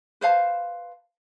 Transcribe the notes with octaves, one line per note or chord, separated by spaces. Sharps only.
B4 C5 F5 A5